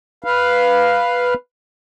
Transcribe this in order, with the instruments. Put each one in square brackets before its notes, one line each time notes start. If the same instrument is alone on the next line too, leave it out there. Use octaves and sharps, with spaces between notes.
[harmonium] B4 F5